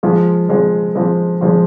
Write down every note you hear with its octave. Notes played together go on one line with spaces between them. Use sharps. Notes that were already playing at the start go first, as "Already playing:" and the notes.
F3 G#3 C4 F4
F3 G#3 C4 F4
F3 G#3 C4 F4
F3 G#3 C4 F4